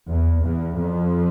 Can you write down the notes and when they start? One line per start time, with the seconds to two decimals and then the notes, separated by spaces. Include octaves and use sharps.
0.09 E2
0.43 E2
0.77 F2